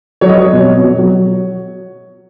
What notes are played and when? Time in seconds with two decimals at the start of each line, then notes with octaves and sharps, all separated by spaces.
0.21 F#3 C#5
0.29 D#5
0.36 F#3 C#5
0.53 B2
0.68 B2
0.84 F#3
0.99 F#3